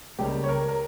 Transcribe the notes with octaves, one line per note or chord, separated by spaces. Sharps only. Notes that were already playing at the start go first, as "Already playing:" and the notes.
C#2 C#3 G3 A#3 G4
C#5
A#4
A#4